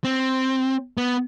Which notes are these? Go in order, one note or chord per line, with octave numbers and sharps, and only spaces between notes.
C4
B3